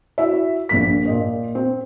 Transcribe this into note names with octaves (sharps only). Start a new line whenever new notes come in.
E4 F#4 E5
A#1 F2 A#2 B6
A#2 D#5
C4